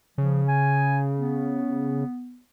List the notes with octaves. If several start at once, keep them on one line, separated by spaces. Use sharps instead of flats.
C#3 F3
G#5
B3